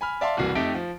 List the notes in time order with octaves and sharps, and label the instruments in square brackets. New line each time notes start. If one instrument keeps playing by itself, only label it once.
[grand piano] G#5 B5 F6
D5 E5 F5 A5 C6
F#1 C2 E3 F#4 C7
F2 A3 D#4 G4 E5 D7
F3